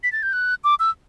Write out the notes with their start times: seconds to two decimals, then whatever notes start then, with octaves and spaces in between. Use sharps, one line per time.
0.03 B6
0.12 A6
0.23 G6
0.33 F#6
0.64 D6
0.80 E6